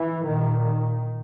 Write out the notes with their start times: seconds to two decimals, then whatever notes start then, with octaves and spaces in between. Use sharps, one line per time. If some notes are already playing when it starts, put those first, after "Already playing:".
Already playing: E3
0.26 A#2 D#3
0.63 D#3